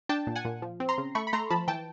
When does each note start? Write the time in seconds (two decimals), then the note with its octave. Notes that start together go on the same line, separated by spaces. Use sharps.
0.09 D4 G5 A5
0.27 A#2
0.36 F#5 G#5
0.45 A#2
0.62 F3
0.80 C4
0.89 A#5 C6
0.98 C#3
1.15 A3 B5 C#6
1.27 B5
1.33 A3 A#5 C6
1.50 F3 A5 B5
1.68 E3 G5 A5